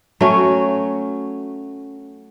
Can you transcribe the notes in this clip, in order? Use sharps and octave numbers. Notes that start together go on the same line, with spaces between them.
F#3 A3 C#4